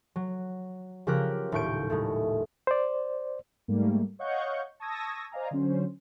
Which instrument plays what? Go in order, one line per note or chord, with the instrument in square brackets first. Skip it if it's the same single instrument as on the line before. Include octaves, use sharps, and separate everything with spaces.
[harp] F#3
C#3 F3 G4 A#4 G5 F#6
D#1 A2 C#6 G6 D7
A2 G#3 A3
[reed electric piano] C5 D5
[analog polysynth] G#2 G3 A3 A#3
C#5 D#5 F5 F#5 C#6 G6
A5 C#6 D#6 E6 G#6 A#6
C5 D5 D#5 F5 G#5 A#5
D3 F#3 C#4 C5